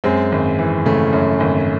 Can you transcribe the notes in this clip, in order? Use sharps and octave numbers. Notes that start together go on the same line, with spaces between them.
F#2 G#3 C4
G#1
E3
C#3 A3
F#2
G#1